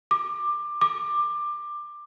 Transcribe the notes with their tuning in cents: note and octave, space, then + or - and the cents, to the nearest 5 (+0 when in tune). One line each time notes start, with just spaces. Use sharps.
D6 +15
D6 +15